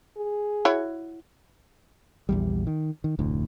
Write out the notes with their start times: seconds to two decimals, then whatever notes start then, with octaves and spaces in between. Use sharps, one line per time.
0.17 G#4
0.65 E4 F#4 C#5
2.29 A#1 E2 G3
2.67 D#3
3.04 D#3
3.19 F1 D2 A2